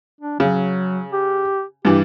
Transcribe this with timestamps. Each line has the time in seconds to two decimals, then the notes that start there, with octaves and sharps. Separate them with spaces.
0.21 D4
0.40 C#3 F#3
1.13 G4
1.85 G2 E3 G4